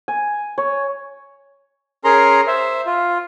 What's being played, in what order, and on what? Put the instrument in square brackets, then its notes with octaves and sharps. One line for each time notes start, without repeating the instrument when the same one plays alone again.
[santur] G#5
C#5
[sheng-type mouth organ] C#4 G#4 A#4 A#5 C6
C5 E5
F4